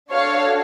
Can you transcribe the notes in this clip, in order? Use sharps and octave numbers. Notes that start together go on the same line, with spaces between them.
D4 F#4 A4 C#5 F5